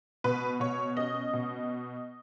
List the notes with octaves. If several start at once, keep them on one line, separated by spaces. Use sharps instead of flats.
B2 B4
B2 C#5
C#4 D#5
B2